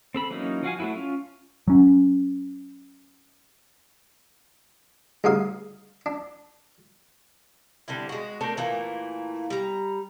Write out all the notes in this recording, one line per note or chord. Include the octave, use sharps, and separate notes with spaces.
C4 A4 B5
E3 F#3 A#3 C#4 D#4
F3 F#4 F5 G#5
F#3 A3 A#3 E4 F#4
C#4 F4
F#3 C#4
D2 G2 C#3 D#4 F5 D#6
D4
D3 G3 C4 E4
G#3 F#4
A3 C4 D4 A#4
A#2 E3 A3 A#3
G3 A#5